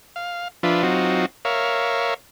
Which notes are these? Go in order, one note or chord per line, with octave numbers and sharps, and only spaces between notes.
F5
F3 D4 F4 B4 E5
F#3 C4 D#4 F4 F#4
A#4 C#5 E5 F5